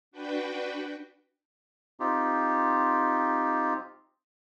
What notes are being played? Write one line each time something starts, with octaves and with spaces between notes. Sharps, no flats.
D4 F#4 B4 G5
C4 D#4 F4 G4